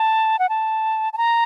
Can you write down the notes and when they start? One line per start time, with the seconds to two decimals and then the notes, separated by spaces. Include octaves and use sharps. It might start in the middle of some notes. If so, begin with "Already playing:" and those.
Already playing: A5
0.39 F#5
0.49 A5
1.13 A5
1.18 A#5